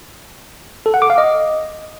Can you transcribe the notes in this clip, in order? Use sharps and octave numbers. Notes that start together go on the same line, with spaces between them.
A4
F#5
D6
F5
D#5